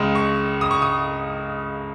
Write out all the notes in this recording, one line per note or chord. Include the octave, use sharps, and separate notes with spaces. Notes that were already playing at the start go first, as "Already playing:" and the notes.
Already playing: C#2 C#3 G#3
C#6
D#6
C#6
D#6